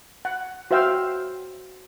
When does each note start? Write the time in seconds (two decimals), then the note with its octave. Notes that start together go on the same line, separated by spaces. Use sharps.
0.25 F#5
0.71 F#4 C5 E5 F5 G5 E6